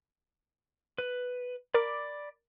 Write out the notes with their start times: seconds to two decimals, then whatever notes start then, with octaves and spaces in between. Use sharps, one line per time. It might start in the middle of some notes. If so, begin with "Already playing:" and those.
0.98 B4
1.74 A#4 D5 B5 D6